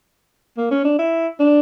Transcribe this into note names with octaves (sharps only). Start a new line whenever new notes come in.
A#3
C#4
D4
E4
D4